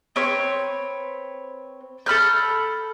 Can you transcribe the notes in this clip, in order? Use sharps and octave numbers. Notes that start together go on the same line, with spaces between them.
C4 B4 C#5
A4 B5 F6 G6